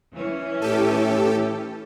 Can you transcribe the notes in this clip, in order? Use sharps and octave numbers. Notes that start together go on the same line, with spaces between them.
E3 C#4
A2 G4 A4